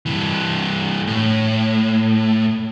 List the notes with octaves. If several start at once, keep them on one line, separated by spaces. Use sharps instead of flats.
G2 E3
A2